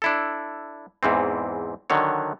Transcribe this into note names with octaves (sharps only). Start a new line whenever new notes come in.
D4 E4 A4
E2 G#2 E3 C4
D3 D#3 F#3 C#5